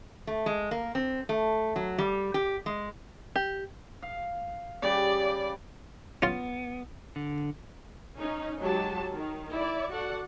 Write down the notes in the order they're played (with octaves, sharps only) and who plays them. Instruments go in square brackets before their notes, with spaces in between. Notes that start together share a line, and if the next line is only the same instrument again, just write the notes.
[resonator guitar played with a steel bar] A3
G#3
A#3
C4
A3
F#3
G3
G4
G#3
[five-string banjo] G4
[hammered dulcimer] F5
[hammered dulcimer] C#3 G3 [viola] D5
[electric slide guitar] B3 [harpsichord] C#4 F4
[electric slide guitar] D3
[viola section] C#4 D#4
F#3 G#3 G4 A5
D#3
E4 D5
F#4 A4 D5 F#5